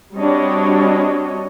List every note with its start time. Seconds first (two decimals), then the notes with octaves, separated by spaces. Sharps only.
0.16 G3 C4 D4 F#4 C#5 D#5